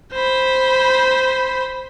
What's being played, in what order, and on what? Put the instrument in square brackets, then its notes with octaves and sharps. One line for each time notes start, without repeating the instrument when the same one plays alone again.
[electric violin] C5 B5